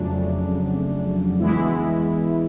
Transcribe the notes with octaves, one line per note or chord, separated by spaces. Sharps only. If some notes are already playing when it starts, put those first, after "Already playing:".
Already playing: F2 C#3 F#3 A3 D4
E3 G#3 B3 E4